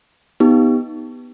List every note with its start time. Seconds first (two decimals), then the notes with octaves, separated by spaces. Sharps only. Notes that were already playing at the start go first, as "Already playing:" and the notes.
0.40 B3 D#4 G4